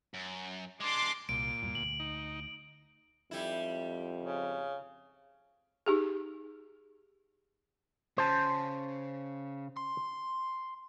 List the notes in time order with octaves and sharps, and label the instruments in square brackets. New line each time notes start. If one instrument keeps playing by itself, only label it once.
[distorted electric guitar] F#2
[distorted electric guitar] G#3 D4 [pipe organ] C6 D6
[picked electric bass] C2 [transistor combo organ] A#2 [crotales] D7
[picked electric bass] G#1 E2 G3
[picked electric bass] D2 [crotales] F#7
[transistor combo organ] D#4
[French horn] F2 [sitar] G#2 G3 E4
[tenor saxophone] C#3
[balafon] D#4 G4 G#4
[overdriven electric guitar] C#3 [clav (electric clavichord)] C5 A5
[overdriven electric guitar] C6